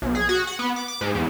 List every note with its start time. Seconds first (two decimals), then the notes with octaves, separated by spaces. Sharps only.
0.02 B1
0.15 G#4
0.29 F#4
0.47 F#5
0.59 B3
0.76 D6
0.88 D6
1.01 G#2
1.15 E2